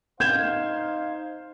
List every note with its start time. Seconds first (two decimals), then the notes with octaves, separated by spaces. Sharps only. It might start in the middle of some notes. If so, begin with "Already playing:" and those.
0.20 D#4 C5 F5 G6 G#6 E7